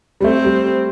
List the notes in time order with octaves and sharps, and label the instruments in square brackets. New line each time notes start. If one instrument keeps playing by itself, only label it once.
[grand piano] G3
[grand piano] A3 [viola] C4
[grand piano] G3